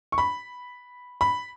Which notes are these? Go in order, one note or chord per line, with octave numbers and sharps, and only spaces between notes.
C#6
B5
B5